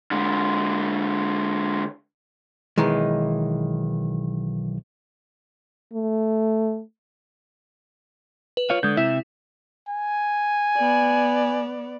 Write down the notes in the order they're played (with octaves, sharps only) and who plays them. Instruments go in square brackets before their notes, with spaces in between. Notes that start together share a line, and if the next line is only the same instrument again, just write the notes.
[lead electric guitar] D3 G#3
[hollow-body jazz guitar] B1 D#3 E3 G#3
[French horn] A3
[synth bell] B4
[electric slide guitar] F4 C#5 F5
[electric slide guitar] D3 [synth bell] G#3 G6
[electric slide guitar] C3 E5 [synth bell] E4
[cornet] G#5
[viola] B3 D5